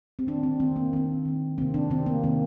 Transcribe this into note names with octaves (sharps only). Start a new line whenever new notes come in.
C4
D#3 A#3 D4
C4
D#3 A#3 C4
A#3
D#3 A#3 C4
D#3 A#3
C3 D#3 A#3 C4
D4
C3 D#3 A#3 C4
A#3
C3 D#3 A#3